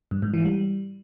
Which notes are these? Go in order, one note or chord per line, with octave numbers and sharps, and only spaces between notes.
G2
G#2
E3
G3